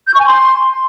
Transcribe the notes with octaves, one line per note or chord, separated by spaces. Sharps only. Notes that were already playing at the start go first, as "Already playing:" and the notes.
G6
C#6
G#5
C6